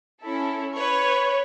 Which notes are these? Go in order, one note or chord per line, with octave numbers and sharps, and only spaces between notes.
C#4 E4 A4
B4 C#5